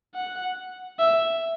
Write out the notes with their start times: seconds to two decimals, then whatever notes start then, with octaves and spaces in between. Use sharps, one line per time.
0.15 F#5
0.99 E5